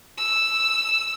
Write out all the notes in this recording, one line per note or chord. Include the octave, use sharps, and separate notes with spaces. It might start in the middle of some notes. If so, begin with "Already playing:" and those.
E6